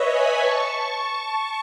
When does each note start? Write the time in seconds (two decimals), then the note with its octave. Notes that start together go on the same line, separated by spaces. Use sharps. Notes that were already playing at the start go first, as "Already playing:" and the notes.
Already playing: B4 C#5 D#5 E5
0.08 G#5 B5
0.38 A5 C#6